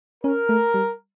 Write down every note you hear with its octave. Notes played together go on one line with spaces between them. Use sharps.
C#4 A#4
A3
G3